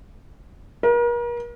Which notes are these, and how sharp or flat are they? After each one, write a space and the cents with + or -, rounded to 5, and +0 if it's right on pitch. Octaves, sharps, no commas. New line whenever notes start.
A#4 +40